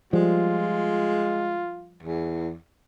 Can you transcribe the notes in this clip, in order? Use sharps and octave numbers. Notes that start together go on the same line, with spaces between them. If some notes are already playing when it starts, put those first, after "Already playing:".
F3 G3 G#3 F4
E2